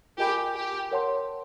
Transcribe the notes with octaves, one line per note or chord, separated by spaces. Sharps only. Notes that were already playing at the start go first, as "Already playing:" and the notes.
F4 G4 A#4 D#5 G#5 B5
G4
A#4 C#5 F#5 A5 C6